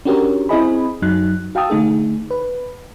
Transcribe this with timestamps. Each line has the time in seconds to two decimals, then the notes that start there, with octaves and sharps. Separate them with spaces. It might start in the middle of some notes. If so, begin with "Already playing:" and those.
0.05 C#4 D4 F#4 G4 A#4 C#5
0.49 C4 E4 G#4 D#5 G#5 B5
1.02 F#2 F#3 D#4 F#6
1.55 F#4 F5 G5 A5 D#6 E6
1.70 D3 A3 D#4 G#4
2.31 B4